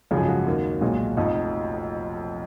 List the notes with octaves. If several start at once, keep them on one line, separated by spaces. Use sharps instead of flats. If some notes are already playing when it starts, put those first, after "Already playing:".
G#1 F#2 C#3 F3 G#3
G#4
F#4
D#2 D#3 A#3
B1 A#2 G#3
F1 F2 F3 D#4